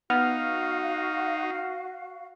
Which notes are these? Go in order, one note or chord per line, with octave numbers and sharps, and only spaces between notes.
B3 D#4 F#4 F5 F6